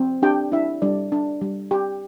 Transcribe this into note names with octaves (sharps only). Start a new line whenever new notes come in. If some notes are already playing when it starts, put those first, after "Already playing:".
Already playing: C4
D4 G4 G5
D4 E4 E5
G3 D4 D5
D4
G3
G4